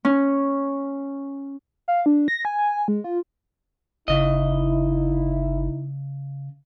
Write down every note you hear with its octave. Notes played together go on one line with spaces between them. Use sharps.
C#4
F5
D4
A#6
G#5
G#5
G#3
F4
G1 C#3 D#4 E4 D#5